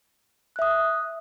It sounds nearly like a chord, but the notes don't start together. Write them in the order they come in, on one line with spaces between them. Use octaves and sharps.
F#6 E5 D#6